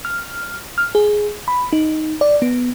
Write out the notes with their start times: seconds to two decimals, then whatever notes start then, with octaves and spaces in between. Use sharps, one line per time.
0.05 F6
0.78 F6
0.95 G#4
1.48 B5
1.73 D#4
2.21 D5
2.42 B3